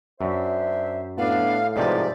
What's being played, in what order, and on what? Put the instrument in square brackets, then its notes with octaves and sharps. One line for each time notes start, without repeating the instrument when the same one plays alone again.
[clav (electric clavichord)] F#2 [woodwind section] D4 C5 E5
[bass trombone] A2 [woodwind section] B3 D4 [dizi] F5
[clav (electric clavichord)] G#2 C3 F3 [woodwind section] D#4 B4 [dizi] D5